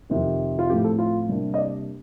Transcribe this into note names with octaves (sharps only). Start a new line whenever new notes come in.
F2 C3 D#3
F4
A2 F3 A3 C4 G4
A4
F4
C3 G3 A#3 D4
D#5
D5